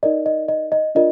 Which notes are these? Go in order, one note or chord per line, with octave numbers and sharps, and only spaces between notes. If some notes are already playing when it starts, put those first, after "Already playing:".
D#4 A#4 D5 D#5
D#5
D#5
D#5
D4 F4 A#4 D5 D#5